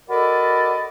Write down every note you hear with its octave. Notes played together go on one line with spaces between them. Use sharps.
F#4 A4 A#4 D5 D#5 B5